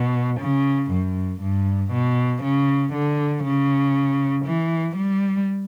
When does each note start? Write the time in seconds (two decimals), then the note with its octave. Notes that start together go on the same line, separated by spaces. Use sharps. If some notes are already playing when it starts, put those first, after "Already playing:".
Already playing: B2
0.40 C#3
0.91 F#2
1.41 G2
1.92 B2
2.43 C#3
2.93 D3
3.44 C#3
4.45 E3
4.96 G3